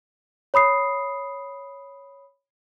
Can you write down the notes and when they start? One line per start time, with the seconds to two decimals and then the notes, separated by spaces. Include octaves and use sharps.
0.54 C#5 B5 D#6 C7